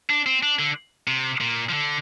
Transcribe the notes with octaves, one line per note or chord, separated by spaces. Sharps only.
D4
C4
D4
D3
C3
A#2
F3
D3